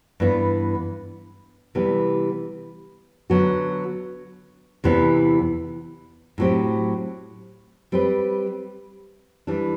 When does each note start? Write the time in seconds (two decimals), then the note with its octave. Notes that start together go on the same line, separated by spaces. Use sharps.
0.20 G2 E3 B3
1.75 C3 E3 G3 B3
3.30 D3 F#3 B3 F#4
4.84 E2 C3 E3 B3
6.38 A2 F#3 C4 G4
7.92 G3 C4 G4 B4
9.47 E3 G3 D4